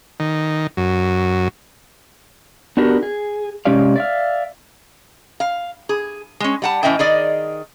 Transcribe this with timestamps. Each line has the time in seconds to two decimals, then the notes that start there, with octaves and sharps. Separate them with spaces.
0.20 D#3
0.77 F#2
2.77 B3 D4 D#4 F#4 G4 A#4
3.03 G#4
3.65 C3 G#3 C#4 G4 D5 F5
3.96 D5 E5 F5
5.40 F5
5.89 G#4
6.40 G#3 C#4
6.62 G3 F#5 A5
6.83 A2 E3 C#4 D#5 E5 G5
6.99 D#3 G#4 D5 D#5